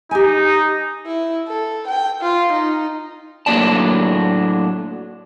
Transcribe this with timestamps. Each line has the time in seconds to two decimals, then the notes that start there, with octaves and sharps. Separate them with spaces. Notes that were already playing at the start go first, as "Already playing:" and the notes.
0.11 D#4 G4 G#5
1.06 E4
1.47 A4
1.88 G5
2.21 F4
2.53 D#4
3.46 A2 F#3 A#3 D4 D5 A5